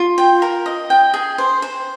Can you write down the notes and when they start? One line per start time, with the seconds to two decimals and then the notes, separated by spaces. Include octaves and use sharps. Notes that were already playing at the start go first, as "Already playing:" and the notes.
Already playing: F4
0.18 G5
0.42 A#4
0.66 D#5
0.90 G5
1.14 G#4
1.38 C5
1.62 C5